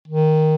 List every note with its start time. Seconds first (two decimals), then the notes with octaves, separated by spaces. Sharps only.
0.08 D#3